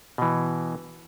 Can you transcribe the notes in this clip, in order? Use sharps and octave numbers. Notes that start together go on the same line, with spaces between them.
B2 E3